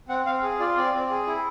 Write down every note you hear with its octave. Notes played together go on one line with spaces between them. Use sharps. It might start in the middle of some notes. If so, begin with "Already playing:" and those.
C4 F#5
C4 F5
G#4
F4 D5
C4 D5
C4
G#4
E4